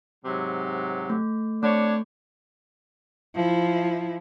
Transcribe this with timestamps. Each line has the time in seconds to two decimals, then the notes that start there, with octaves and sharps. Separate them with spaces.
0.25 G#2 C3 F#3
1.10 A3
1.63 A3 C4 D4 C#5
3.35 F3 E4